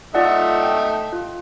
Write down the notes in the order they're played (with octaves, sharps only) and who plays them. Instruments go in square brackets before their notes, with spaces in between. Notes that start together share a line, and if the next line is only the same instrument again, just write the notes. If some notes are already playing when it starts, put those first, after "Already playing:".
[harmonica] A3 D#4 E5 [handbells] F4 D5 F#5
[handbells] G5
F4